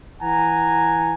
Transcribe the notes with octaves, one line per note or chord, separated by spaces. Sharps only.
E3 F#5 G#5 A#5